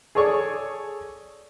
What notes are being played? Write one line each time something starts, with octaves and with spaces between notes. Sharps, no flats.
G#4 A4 C#5 D5 C#6 D#6